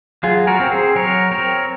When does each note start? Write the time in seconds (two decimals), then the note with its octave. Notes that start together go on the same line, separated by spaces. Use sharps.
0.23 F#3 F4 G#4
0.47 F#4 A#4
0.60 C4
0.71 G#4 C5
0.96 F#3 A#4 C#5
1.31 C4 A#4 C#5